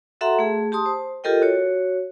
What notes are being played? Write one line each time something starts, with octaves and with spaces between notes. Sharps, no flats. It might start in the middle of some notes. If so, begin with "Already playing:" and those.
F#4 A4 E5 F#5 A#5 C6
A3 G#4
G4 A5 C6 D#6
C5
F4 G4 A4 A#4 D#5 G5
F#4 C#5